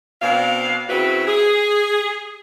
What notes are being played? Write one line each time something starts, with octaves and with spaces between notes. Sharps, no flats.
B2 C4 D4 F5
C#3 C4 E4 F#4 B4
G#4